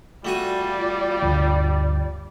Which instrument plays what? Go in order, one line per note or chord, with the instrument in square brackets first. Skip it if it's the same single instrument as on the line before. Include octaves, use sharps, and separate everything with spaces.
[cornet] G3 [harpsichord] A3 F#4 G#5 [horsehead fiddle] F4 D5
[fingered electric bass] D2 G2